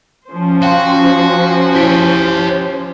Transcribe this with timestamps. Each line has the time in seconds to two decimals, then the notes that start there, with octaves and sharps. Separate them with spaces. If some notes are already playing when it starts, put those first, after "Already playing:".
0.28 F3 C#4 C5
0.63 F#4 F5 G5 C6
1.75 E4 G4 C#5 B6 D7